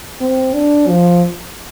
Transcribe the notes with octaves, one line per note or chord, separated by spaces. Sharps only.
C4
D4
F3